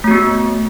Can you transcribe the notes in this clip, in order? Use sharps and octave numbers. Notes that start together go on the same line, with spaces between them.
A3 B3 F#4